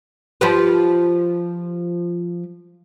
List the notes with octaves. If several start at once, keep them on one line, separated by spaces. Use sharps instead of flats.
F3 G4 B4